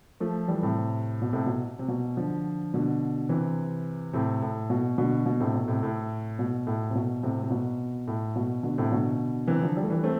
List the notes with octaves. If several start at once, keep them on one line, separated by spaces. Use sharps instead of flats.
F3 A3
E3 G3
A2 C3
B2
A2 C3
B2
C3
B2
D3 F3
B2 D3
C3 E3
A2 C3
A2
B2
B2 D3
B2
A2 C3
B2
A2 C3
A2
B2
A2
C3
B2
A2 C3
C3
B2
A2
B2
B2 D3
A2 C3
B2 D3
C3 E3
D3 F3
G3
A3
E3 G3
A3 C4